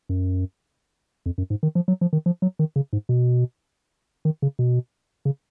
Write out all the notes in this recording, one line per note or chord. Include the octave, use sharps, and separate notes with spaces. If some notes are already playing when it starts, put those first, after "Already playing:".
F#2
F2
F#2
G#2
D#3
F3
F#3
F3
D#3
F3
F#3
D#3
C#3
G#2
B2
D#3
C#3
B2
C#3